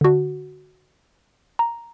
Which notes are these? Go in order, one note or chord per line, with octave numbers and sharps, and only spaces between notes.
D3 F#4
A#5